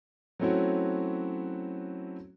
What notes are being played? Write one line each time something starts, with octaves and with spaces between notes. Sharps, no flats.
F#3 A3 C4 C#4 E4 F#4